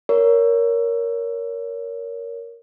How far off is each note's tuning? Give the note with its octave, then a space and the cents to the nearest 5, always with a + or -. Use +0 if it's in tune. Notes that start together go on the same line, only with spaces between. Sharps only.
A#4 +5 C#5 +25